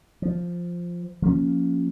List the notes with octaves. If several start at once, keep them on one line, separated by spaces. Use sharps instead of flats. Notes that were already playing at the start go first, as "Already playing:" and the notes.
F3
F3 A#3 C#4